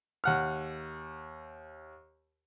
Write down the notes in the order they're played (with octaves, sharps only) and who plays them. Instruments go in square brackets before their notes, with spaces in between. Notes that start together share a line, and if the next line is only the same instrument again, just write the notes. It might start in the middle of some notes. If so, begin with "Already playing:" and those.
[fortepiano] D#2 F#5 F6